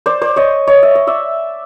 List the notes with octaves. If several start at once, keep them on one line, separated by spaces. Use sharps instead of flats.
C5 D5
C5 D5
C#5 D#5
C#5 D#5
E5
D#5
D5 E5